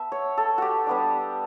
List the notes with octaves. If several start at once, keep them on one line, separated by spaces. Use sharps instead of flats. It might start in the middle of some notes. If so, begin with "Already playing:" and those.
Already playing: B3 E5 A5
C#5
A4
F#4 G4
G3 B3 D4